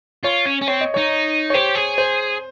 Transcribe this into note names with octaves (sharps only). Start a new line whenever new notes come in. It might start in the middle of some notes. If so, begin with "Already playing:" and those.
F4 C#5
C#4
C#4
C4 C#5
D#5
D#4 C#5
C#5
G4 C5
G#4
C5